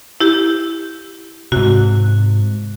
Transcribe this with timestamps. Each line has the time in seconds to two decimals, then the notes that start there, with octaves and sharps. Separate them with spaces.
0.20 E4 G4
1.52 G#2 C3 F#4